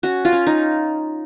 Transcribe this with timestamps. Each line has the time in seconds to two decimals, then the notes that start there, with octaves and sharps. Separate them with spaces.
0.03 C#4 F#4
0.25 F4
0.32 C#4
0.47 D#4